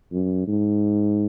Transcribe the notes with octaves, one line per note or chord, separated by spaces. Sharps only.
F#2
G#2